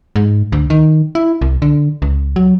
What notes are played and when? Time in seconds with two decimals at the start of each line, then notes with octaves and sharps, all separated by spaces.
0.16 G#2
0.52 D2
0.70 D#3
1.15 E4
1.41 C2
1.62 D3
2.02 C#2
2.36 F#3